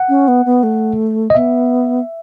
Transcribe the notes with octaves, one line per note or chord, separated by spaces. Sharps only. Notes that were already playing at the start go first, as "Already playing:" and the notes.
Already playing: F#5
C#4
B3
B3
A3
D#5
B3 E5